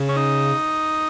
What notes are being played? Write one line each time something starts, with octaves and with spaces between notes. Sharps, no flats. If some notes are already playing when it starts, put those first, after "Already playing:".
Already playing: C#3
C#4
D#4